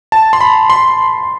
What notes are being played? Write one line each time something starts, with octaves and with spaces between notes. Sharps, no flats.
A5
C6
B5
C6